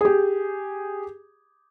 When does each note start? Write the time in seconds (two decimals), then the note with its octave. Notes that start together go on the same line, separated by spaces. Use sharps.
0.01 G4 G#4